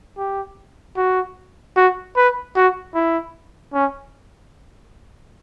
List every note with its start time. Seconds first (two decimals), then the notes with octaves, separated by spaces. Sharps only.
0.18 G4
0.97 F#4
1.76 F#4
2.16 B4
2.56 F#4
2.94 E4
3.74 C#4